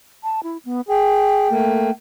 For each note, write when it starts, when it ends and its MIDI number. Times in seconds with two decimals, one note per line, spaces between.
0.24 0.43 81
0.43 0.58 64
0.65 0.81 59
0.89 1.48 68
0.89 1.91 79
1.50 1.90 57
1.50 1.90 58